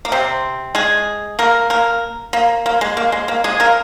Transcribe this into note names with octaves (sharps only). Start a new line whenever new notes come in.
A#3
C3 C4
G#3 G#4
A#3 A#4
A#3 A#4
A#3
A#3
G#3
A#3
G#3
A#3
G#3 G#4
A#3 A#4